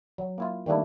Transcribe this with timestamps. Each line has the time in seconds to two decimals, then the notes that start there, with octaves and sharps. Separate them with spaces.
0.18 F#3
0.38 A#3 E4 F4
0.66 D#3 G3 A3 A#3 D4 E4